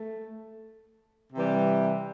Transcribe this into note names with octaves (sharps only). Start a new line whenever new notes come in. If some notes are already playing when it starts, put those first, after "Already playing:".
Already playing: A3
C3 E3 G3